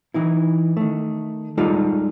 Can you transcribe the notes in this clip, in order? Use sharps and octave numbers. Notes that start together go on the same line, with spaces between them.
E3 D#4 E4
D#3 A3
G3 G#3 D#4 F4 A4